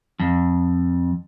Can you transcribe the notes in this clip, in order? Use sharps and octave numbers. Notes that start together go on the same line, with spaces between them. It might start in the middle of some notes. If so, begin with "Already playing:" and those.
F2